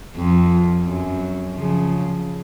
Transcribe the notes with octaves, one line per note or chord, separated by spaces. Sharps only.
F2
F#2
C#3 F3